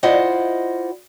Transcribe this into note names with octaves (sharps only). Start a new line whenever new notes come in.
E4 F4 C5 D5 D#5 F#5